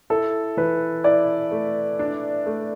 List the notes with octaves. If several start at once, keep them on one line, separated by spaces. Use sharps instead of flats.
E4 A4
E3 B4
E4 D5
A3
D4
A3